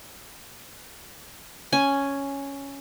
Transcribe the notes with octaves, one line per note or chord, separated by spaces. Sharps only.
C#4 G#5